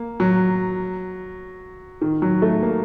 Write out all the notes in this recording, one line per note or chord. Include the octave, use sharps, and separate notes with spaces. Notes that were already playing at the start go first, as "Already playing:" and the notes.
Already playing: A#3
F#3
D#3
F#3
A3
A#3